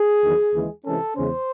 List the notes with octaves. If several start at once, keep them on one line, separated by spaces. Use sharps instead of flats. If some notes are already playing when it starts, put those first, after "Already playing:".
Already playing: G#4
E2 D#3 F#3
D#2 C#3 E3 G#3
C3 E3 G#3 C#4 A4
E2 C#3 G#3 C#4 C5